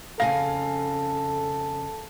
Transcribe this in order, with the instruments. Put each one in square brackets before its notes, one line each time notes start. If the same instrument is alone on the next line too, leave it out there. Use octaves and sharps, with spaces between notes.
[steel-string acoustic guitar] F2 C#3 G#5 [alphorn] A4 [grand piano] F5 A#6